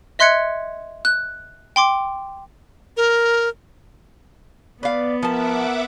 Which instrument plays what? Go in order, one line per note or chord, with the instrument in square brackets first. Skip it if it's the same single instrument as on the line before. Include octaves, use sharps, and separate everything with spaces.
[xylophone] D#5 E5 C6 F#6 G#6 C#7
F#6
G5 C6 D6
[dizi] A#4
[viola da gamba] B3 [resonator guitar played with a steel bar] B4 F5 [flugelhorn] D5
[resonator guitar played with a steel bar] F3 A5 [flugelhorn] A#4 [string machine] E5 F#5 D6